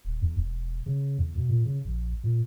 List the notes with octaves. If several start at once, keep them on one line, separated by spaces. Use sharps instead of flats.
D#1
E2
E1
C#3
E2
B2
A#2
C#3
A#1
A#2